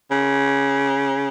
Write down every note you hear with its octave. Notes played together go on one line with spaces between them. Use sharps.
C#3